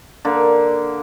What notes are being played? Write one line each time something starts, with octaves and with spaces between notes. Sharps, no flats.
D3 A#3